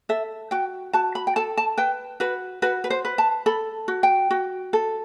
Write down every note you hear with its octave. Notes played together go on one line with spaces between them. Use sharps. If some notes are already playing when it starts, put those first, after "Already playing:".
A4 E5
F#4 G5
F#4 A5
B5
G5
A4 A5
A5
B4 G5
F#4 B4
F#4 B4
B4
C5
B4
A5
A4 B5
F#4
G5
F#4
A4